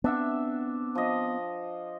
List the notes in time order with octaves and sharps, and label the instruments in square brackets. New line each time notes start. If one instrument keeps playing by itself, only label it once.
[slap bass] B3 C4 [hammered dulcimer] D4 E5 F#5
[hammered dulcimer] F3 D#5